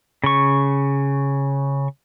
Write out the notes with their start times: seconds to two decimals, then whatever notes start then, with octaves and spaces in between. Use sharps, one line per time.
0.24 C#3 C#6